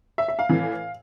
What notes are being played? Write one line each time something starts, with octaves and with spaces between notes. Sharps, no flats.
E5
E5
F5
A2 E3